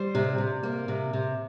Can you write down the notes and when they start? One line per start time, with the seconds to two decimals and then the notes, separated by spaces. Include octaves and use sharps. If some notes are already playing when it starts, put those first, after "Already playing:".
Already playing: G3 C5
0.15 C3
0.38 C3
0.63 A#3
0.88 C3
1.13 C3